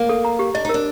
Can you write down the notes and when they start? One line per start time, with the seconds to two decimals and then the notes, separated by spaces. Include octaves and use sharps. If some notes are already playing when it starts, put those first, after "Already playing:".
Already playing: A#3
0.09 A4
0.25 A#5
0.39 G4
0.55 D4 D#5
0.65 D#4
0.69 D4 A#4